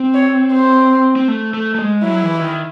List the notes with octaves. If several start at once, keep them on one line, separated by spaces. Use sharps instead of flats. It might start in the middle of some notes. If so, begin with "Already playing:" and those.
Already playing: C4
C#5
C5
C4
A3
A3
A3
G#3
F#3 E4
E3
D#3